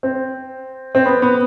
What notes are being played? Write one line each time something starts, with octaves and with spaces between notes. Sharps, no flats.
C4
C4
B3
B3